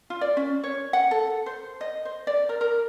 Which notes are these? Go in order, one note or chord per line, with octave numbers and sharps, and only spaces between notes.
F4
D5
C#4
C#5
F#5
A4
C5
D#5
C5
D5
A#4
A#4